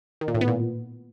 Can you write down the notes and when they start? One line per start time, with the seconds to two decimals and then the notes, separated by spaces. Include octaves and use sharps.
0.21 D#3
0.28 A#2
0.35 A2
0.41 B3
0.48 A#2